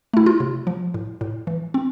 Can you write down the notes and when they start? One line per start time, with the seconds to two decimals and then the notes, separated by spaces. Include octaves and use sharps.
0.14 A3 E4
0.26 F4
0.40 C3
0.67 F3
0.94 A2
1.21 A2
1.47 E3
1.74 C4